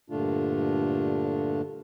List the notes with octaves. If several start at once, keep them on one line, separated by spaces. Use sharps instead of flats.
G2 A#2 D3 A3 D4 F4